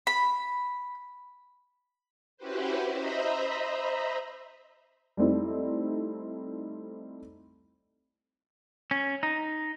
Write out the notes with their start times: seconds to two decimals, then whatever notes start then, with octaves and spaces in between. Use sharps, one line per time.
0.07 B5
2.37 C#4 E4 F#4 G4 B4 C5
2.92 C5 D#5 E5 A#5 B5
5.17 G3 A3 C4 D#4 E4
8.91 C#4
9.23 D#4